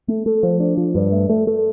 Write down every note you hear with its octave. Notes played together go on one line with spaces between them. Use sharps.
A3
A3
F3
D4
F3
G2
A3
A3
A3